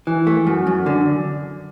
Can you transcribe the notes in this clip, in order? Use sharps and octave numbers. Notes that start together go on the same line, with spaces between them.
E3
A3
F#2
F#2
D3